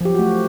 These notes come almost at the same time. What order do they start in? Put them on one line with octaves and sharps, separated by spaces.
F3 G4 F#3 F#4 A3